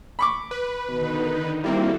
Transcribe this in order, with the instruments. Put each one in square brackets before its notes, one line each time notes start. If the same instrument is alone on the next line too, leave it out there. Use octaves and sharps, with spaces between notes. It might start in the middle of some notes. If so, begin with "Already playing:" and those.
[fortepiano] B5 C#6 D6
[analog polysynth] B4
[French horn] B2 [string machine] D3 D#3 D#4
[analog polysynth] G3 A#3 C4 [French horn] E4 [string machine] F#4 A4